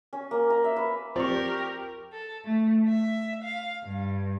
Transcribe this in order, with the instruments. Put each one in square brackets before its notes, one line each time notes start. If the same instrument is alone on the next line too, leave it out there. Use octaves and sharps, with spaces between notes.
[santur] C#4
A#3
A#5
E5
B4
[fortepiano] F3 C4 [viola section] G4 A#4 [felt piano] D5 C#6
[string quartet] A4
A3
E5
F5
G2